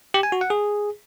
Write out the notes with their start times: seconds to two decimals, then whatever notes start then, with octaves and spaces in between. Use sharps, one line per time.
0.14 G4
0.23 G#5
0.32 F#4
0.41 F#5
0.50 G#4